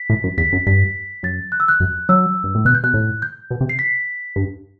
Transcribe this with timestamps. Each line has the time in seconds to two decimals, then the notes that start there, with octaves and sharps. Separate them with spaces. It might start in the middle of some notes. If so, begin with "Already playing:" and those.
Already playing: B6
0.10 A2
0.24 F#2
0.38 E2 B6
0.53 F#2
0.67 G2 B6
1.23 F#2 A6
1.52 F#6
1.60 E6
1.68 F#6
1.80 F#2
2.09 F#3 E6
2.44 G2
2.55 A2
2.65 B2 F#6
2.75 G6
2.83 B2 F#6
2.94 A2
3.22 G6
3.51 B2
3.60 C3
3.69 C7
3.79 B6
4.36 G2